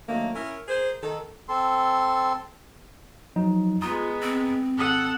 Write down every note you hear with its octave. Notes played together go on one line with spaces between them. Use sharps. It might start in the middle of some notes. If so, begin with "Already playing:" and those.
D3 D#3 F#3 A3 A#3
C#4 E4 A#4
G#4 A#4 C5
D#3 A4
C4 A4 C6
F3 F#3 D#4
G#3 B3 F4 A#5 D#6
C4
G#1 A4 F#5 D#6